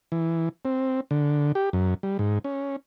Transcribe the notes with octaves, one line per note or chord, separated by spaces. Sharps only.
E3
C4
D3
G4
F#2
G3
G#2
C#4